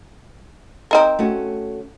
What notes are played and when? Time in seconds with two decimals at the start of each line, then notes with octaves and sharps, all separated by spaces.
0.91 C4 D#4 A#4
1.19 A3 C#4 F#4